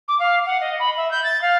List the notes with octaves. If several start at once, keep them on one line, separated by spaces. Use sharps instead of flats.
D6
F5
F#5
D#5
B5
E5
G6
A6
F5